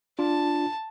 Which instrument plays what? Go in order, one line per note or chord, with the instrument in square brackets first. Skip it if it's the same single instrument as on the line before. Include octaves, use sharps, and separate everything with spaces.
[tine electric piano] D4 F4 [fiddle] A5